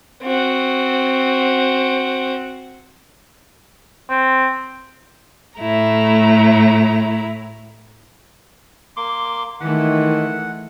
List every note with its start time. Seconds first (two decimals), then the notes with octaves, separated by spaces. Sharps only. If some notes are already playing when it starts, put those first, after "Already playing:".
0.23 C4 F#4
4.10 C4
5.59 A2 A3 E4 A#5
8.97 A#3 C6 D6
9.60 D#3 E3 G#3 A3 F#5